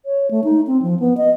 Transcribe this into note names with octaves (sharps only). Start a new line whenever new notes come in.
C#5
A3
D#4
C4
F3
B3
D#5